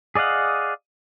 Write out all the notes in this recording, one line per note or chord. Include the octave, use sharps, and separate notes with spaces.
G#4 D5 D#5 F5 F#5